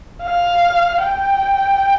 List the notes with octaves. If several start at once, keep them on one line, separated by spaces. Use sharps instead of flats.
F5
G5